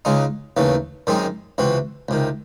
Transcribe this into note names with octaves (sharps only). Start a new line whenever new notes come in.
C#2 C#3 G#3 D#4
D#2 C#3 E3 A3
F#2 D#3 G#3 C4 D#4
C#2 C3 E3 C4 F#4
C#2 C3 D#3